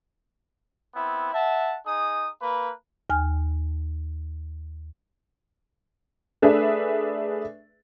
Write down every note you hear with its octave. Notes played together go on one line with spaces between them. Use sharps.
B3 C4 E4
E5 F#5 A5
D#4 G#4 D#6
A#3 B4
D#2 G#5 F6
A3 D4 G#4 B4 E5